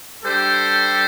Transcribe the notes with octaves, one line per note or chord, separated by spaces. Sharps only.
G3 D4 G4 A4 C5